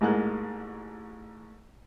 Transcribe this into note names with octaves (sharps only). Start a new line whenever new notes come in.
A1 G#2 G#3 A#3 F#6